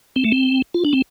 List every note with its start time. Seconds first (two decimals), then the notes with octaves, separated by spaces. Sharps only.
0.16 C4
0.24 A3
0.32 C4
0.74 F4
0.85 D4
0.93 C4